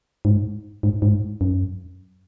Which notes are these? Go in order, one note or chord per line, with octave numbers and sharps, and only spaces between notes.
G#2
G#2
G#2
F#2